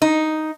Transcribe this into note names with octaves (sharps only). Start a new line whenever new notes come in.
D#4